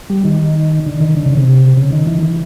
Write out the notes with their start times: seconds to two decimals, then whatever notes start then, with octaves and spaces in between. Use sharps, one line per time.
0.10 G3
0.25 D#3
0.86 D3
1.01 D#3
1.17 D3
1.26 C#3
1.37 C3
1.77 C#3
1.92 D#3
2.07 E3
2.22 E3